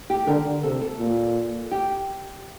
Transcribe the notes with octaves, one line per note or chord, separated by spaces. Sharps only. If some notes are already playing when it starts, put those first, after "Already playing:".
G4
D3 A#4
C3 A4
A4
A#2
G4